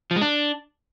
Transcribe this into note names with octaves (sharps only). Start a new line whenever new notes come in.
F3
G#3
D4